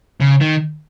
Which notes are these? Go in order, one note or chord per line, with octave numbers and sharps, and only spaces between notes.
C#3
D#3